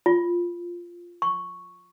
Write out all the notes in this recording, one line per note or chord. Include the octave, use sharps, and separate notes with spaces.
F4
C#6